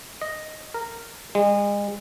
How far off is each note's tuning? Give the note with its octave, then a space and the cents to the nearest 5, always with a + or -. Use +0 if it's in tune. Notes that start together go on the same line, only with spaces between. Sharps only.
D#5 +0
A#4 -10
G#3 -35